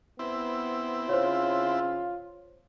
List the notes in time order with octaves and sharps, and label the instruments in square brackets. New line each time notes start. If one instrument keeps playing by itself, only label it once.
[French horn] B3 [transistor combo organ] C4 E4
[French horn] C#3 [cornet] F4 [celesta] C5 C#5